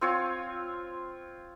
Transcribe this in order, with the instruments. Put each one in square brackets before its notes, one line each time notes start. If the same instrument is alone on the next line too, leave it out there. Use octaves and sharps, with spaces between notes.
[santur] C4 F4 C#5